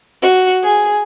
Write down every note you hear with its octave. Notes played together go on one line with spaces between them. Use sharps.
F#4
G#4